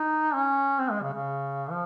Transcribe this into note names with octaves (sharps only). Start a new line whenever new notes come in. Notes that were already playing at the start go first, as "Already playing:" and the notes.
Already playing: D#4
C#4
C4
G#3
C#3
C#3
F3